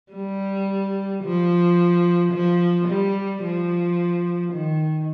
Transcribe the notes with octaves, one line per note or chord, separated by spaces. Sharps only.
G3
F3
F3
G3
F3
D#3